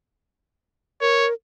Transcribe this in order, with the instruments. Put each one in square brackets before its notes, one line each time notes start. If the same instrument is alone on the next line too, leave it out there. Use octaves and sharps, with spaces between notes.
[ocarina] A#4 [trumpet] C#5